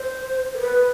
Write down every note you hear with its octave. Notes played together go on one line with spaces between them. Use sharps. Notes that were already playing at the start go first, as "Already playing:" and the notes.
Already playing: C5
A#4
B4